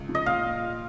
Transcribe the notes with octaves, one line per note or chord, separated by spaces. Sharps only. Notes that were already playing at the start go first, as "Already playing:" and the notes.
Already playing: C#2
C#3 F3
D#5
A#2 F5